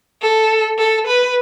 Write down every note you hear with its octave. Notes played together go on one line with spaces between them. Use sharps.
A4
A4
B4